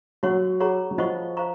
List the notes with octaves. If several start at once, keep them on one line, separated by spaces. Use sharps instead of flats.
F#3 F#4 C#5 F#5 C#6
G#4 C#5 F#5 A#5 C#6
F#3
F3 F4 C5 D#5 F#5 C#6
C5 F5 A#5 C#6